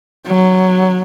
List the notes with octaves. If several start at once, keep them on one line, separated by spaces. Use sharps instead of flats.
F#3